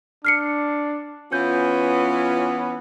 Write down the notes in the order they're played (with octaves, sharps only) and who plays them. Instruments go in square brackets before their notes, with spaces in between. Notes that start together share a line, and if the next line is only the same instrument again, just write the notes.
[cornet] D4 [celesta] F6 C7 C#7
[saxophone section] E3 C#4 [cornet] B3 [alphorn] F4 [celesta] G6